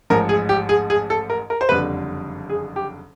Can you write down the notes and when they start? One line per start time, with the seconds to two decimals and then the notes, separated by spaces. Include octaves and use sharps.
0.10 A1 G#2 F3 A#4
0.29 G#4
0.49 G4
0.69 G#4
0.90 G#4
1.10 A4
1.30 A#4
1.50 A#4
1.61 C5
1.69 F#1 F2 D3 G3 B4
2.50 G#4
2.76 G4